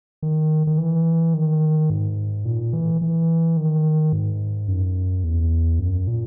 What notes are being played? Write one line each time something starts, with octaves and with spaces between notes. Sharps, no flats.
D#3
D#3
E3
D#3
G#2
A#2
E3
E3
D#3
G#2
F#2
E2
F#2
A#2